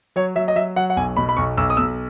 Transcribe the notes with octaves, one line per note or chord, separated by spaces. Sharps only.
F#3 C#5
F#3 E5
D#5
F#3 E5
F#3 F#5
F#5
B1 G#5
B2 B5
B5
B1 C#6
B1 E6
D#6
B1 E6